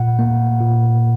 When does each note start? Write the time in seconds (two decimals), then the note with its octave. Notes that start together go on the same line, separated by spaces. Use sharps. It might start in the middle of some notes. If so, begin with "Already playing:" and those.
Already playing: A#2 F#5
0.19 A#3
0.60 A#2